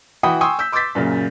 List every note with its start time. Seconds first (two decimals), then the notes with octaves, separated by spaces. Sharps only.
0.23 E3 F#4 F#5 G5 B5 D#6
0.41 G5 G#5 C6 C#6 D#6 E6
0.59 E6 G6 B6
0.72 C6 D6 E6 G6 A6 B6
0.95 F#2 A#2 C#3